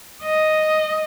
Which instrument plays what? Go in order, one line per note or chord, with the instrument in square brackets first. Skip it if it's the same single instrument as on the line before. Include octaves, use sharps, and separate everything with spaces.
[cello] D#5